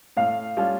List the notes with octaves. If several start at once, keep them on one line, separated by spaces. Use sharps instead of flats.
A2 F5
G3 C#4 F4 A4